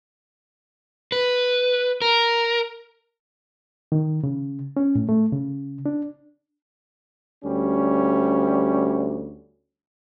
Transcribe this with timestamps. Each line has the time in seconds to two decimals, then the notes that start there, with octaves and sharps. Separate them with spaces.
1.12 B4
2.02 A#4
3.92 D#3
4.24 C#3
4.77 C#4
4.95 A2
5.09 A3
5.32 C#3
5.86 D4
7.43 D2 G3 C#4